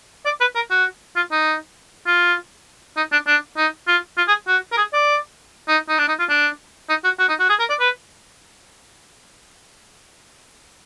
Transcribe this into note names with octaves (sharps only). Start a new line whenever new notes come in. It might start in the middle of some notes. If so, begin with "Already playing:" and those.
D5
B4
A#4
F#4
F4
D#4
F4
D#4
D4
D4
D#4
F4
F4
G#4
F#4
A#4
G#4
D5
D#4
D#4
D4
D#4
F4
D4
D#4
F#4
F#4
D#4
F#4
G#4
A#4
D5
B4